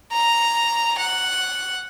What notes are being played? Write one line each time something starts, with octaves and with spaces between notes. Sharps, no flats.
A#5
F#5